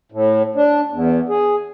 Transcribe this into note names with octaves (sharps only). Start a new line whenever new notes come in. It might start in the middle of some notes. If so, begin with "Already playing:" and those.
A2
D4
E2
G#4